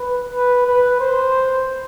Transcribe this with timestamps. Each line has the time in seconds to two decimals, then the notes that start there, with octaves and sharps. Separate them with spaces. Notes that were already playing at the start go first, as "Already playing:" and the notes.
Already playing: B4
0.33 B4
0.66 B4
1.00 C5